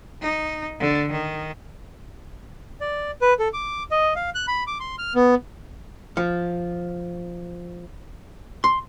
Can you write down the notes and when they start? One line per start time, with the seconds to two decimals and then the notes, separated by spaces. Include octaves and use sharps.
0.21 D#4
0.80 D3
1.11 D#3
2.81 D5
3.22 B4
3.39 A4
3.53 D6
3.91 D#5
4.16 F5
4.35 F#6
4.48 B5
4.67 D6
4.80 C6
4.98 F6
5.15 B3
6.17 F3
8.64 C6